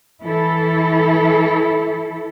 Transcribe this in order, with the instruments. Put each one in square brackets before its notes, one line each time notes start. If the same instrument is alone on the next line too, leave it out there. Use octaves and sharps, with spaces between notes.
[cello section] E3 E4 A4